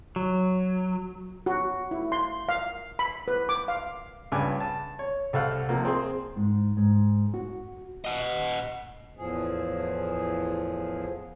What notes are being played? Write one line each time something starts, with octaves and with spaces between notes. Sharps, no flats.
F#3
F#4
E4
C6
F5
B5
B4
D6
F5
C#2 G2 G#5 D6
A5
C#5
C2 A4 C5 F5 F#5 F6
C3 F3 A#3
C4 G#4 C6
G#2
G#2
F#4
D#5 F#5
E2 A2 F3 G#4